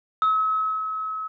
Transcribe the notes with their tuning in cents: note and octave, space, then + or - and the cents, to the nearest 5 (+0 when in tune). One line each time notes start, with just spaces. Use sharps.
E6 -45